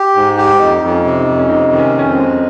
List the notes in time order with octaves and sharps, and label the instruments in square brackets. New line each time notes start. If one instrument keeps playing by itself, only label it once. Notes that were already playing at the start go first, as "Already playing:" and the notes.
Already playing: [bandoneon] G4
G#2
G4
[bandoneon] F2 [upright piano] D#4
[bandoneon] F2 [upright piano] D#4
[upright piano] C#4
[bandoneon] C3
[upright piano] D#4
[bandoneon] F2
[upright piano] C#4
[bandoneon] C3 [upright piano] D#4
[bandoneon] D#3
[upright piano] C#4
[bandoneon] F2 [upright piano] C#4
[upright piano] C4
[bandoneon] G#3